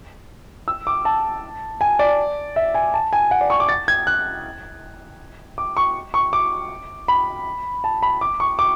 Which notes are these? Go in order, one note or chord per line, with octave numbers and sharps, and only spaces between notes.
E6
D6
A5
G#5
D5
E5
G#5
A5
G#5
F#5
D5
C#6
D6
A6
G#6
F#6
D6
C#6
C#6
D6
B5
A5
B5
D6
C#6
D6